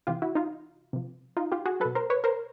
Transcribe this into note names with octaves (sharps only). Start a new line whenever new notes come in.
C3 E3 F4 G4
E4 F#4
D#4 F4
C3 F3
D#4 F4
F4 G4
F#4 G#4
F#3 A4 B4
B2
A#4 C5
B4 C#5
A#4 C5